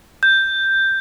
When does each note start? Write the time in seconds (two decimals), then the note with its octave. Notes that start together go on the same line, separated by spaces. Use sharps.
0.23 G6